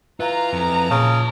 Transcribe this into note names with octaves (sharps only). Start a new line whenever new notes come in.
E3 F4 A#5
F2
A#2 C#3 C#5 A5